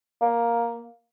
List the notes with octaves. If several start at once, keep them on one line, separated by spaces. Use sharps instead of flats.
A#3